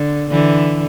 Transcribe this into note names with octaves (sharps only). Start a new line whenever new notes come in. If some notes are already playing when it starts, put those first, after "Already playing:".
Already playing: D3
D3 E3